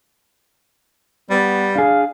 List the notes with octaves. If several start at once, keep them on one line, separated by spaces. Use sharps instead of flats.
G3 B3
D4 G#4 F5